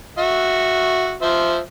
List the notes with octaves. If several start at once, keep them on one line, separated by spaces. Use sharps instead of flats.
F#4 E5
F3 C5 E5